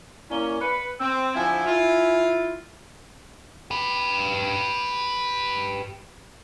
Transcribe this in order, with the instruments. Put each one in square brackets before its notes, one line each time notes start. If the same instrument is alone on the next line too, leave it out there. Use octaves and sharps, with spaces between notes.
[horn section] A#3 C#4 [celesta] E4 D5 G7
[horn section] B4 [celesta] B5 F#6 C#7
[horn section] C4 [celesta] E6
[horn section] D3 F3 E4 [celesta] G#5 G#6
[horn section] E4 F4
[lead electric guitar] G4 B4